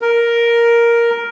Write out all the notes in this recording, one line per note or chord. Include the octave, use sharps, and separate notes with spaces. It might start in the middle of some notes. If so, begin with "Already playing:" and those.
A#4